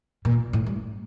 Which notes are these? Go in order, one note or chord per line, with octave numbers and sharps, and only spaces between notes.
A#2
A2
G2